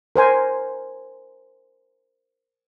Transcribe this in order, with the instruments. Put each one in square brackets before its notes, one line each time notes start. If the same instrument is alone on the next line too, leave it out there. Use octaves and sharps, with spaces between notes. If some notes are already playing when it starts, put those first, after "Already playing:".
[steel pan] A#4 C5 G#5